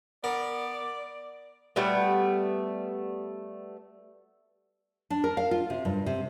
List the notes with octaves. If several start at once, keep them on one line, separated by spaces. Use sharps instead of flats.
B3 A#4 D5
G3 A3 B3
D4
A#4
F5
F4
C3
G2
C3